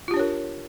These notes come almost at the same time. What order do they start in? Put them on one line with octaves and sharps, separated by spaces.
F4 G4 D4 C#5 A#4